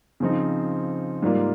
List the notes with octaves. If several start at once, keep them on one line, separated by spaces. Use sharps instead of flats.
C#3 F3 C4 D#4
G#2 G3 A#3 F4